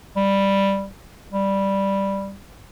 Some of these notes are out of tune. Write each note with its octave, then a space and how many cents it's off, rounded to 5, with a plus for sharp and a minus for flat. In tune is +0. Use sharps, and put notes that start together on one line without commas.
G3 +5
G3 +0